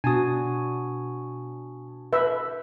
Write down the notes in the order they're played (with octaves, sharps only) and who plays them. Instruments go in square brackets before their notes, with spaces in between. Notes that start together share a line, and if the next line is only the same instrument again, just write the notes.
[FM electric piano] B2 [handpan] D4 F#4 [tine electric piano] G#5 A5 D#6
[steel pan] B4 E5